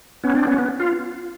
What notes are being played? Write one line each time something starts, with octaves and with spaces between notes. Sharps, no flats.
B3 C#4
C4 D4
B3 C#4
B3
F4